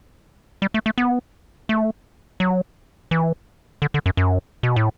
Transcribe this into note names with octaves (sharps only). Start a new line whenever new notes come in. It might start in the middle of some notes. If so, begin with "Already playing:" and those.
G3
A3
A3
B3
A3
F#3
E3
D3
D3
F#2
F#2
B2
A2